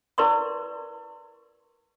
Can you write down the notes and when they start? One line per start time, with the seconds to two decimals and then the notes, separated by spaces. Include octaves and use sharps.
0.18 E4 A#4 B4 D5 C6 C#6